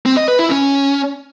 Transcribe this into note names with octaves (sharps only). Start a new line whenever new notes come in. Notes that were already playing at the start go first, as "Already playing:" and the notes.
C4
D#5
B4
E4
C#4